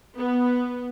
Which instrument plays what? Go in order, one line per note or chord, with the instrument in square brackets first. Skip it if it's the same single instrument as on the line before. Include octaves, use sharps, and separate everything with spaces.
[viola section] B3